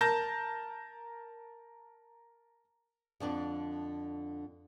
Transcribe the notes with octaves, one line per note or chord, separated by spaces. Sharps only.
A#4 A5 G6 A#6
F2 D3 D4